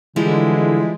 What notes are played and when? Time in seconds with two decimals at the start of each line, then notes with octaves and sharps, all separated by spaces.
0.16 D3 E3 F3 G3 G#3 E4